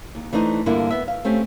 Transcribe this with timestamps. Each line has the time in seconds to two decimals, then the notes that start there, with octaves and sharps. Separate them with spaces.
0.15 D#2
0.33 E3 A3 D4 D#4 C5
0.66 G2 D3 A#3 D4 E4 F4
0.91 B3 E5
1.08 F5
1.25 A3 C4 C#4 G4